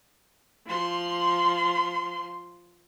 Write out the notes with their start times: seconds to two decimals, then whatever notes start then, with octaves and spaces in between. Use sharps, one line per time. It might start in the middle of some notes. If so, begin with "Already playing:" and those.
0.67 F3 C6